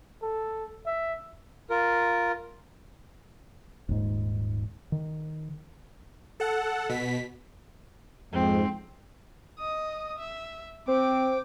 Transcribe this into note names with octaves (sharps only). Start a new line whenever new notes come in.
A4
E5
F4 A#4
D#1 G#2
D#3
A4 F#5
B2 B6
F2 G#2 C4
D#5 D#6
E5
C4 C5 G5 D6